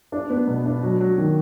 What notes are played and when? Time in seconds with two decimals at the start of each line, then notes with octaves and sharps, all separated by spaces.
0.12 D4
0.30 B3
0.47 B2
0.65 D4
0.83 F#3
1.00 F#3
1.18 D#3